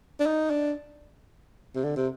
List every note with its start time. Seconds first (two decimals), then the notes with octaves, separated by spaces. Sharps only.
0.20 D4
0.26 D#4
0.50 D4
1.76 C3
1.84 D3
1.97 C3